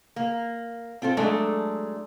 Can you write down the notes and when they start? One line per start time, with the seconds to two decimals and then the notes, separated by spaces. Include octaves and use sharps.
0.16 A#3
1.02 C4 F4 A4 C5
1.17 F#3 G#3 A3 D4 A4